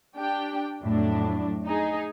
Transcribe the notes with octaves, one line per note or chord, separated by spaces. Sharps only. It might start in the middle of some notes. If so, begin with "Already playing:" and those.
D4 G4 G5
F2 A2 F#3 D4
D#4 G#4